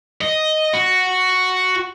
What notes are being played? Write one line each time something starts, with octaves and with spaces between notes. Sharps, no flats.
D#5
F#4